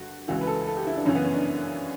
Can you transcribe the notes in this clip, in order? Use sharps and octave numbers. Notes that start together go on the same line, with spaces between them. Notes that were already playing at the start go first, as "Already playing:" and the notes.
Already playing: G2 D3 F#4
C#2 C#3 E3 F#4
B4
A4
A4
G4
E4
D4
F#2 C#3 E3 C#4
B3
C#4
D4